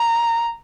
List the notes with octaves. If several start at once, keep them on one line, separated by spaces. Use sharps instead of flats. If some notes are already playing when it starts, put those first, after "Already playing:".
Already playing: A#5